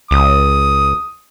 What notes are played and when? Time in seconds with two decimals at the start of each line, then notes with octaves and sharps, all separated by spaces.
0.11 C#2 D#6